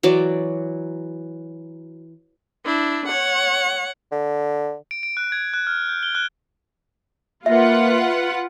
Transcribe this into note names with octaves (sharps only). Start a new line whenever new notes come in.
E3 F#3 D5 D6
D4 E4
C#5 F#5
D3
D7
D7
F#6
G#6
F#6
F6
G6
G7
F#6
A#3 F4 B4 E5 F#5